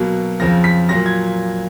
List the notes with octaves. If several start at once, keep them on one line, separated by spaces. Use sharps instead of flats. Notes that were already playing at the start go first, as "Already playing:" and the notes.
Already playing: B2 F#3 A#3
F2 C#3 F3 A#6
B6
A#2 F#3 A#3 A#6
G#6